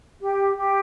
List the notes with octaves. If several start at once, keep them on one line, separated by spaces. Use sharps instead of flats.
G4
G4